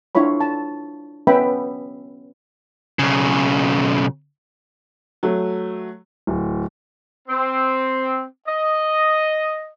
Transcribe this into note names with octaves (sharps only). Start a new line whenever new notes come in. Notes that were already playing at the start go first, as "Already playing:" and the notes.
D4 E4 F4 C#5 B5
A5
B3 C#4 B4 E5 G5 B5
B1 C#3
F#3 A3
D1
C4
D#5